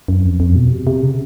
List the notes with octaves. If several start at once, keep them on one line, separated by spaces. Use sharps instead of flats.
F#2
F2
F2
B2
C3
C3
C#3